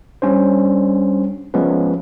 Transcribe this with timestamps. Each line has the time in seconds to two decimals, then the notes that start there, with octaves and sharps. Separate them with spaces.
0.22 G3 C#4 D4 C5
1.54 F3 G#3 B3 C#4 B4